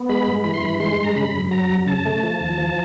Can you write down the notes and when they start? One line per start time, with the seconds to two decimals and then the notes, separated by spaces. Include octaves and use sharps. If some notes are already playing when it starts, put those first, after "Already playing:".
Already playing: B3
0.09 G#3 B5
0.27 G2
0.44 E3 B5
0.54 C6
0.62 G2 B5
0.80 G#3 C6
0.98 G2
1.04 A#5
1.16 C#3 B5
1.34 F#2
1.51 F#3 A#5
1.70 F#2
1.87 C#3 A5
2.05 A3
2.23 F3
2.40 D#2
2.58 F3